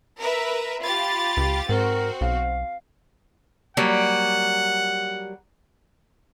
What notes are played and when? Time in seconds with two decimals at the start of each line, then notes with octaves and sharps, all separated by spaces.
0.19 A#4 B4 E5
0.83 F4 G4 B5 A6
1.37 C#2
1.69 G#2 C4 F#4 A#4
2.21 B1 F5
3.77 F#3 G3 A#3 F#5